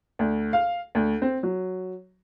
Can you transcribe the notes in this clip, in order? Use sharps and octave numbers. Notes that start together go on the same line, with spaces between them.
D2
F5
D2
C4
F#3